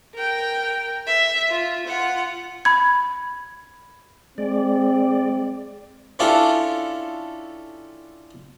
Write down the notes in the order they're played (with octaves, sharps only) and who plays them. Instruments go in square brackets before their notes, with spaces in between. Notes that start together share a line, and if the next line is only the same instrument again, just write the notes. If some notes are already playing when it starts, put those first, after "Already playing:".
[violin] A#4 G5
E5
F4
F4 F#5
[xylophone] B5 G#6
[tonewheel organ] G#3 D5 [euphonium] C4
[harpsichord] C#4 D4 E4 F4 G4 A4